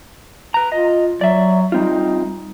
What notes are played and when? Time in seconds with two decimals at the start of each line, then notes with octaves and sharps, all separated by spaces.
0.54 B4 A#5
0.72 F4 D#5
1.21 F#3 D5 E5
1.72 G3 C4 D#4 F4